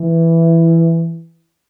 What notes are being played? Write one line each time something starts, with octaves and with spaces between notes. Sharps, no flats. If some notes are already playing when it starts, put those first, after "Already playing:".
Already playing: E3